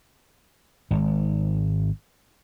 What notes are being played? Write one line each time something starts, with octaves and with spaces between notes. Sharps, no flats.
G#1 G#2